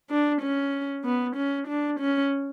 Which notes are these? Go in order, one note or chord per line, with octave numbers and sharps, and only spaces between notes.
D4
C#4
B3
C#4
D4
C#4